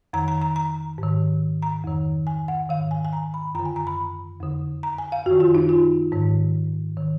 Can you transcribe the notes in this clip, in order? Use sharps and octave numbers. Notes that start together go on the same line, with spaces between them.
F2 D#3 A#5
A#5
A#5
A#5
G#2
D#3
A#5
F2 D#3
G#5
F#5
G#2 D#3 F5
G#5
G#5
A#5
B5
F#2 D3 A#5
G#5
A#5
B5
F2 D3
A#5
G#5
F5
F#2 F#4
D#3
F4
D#4
F4
G#2 D#3
D#3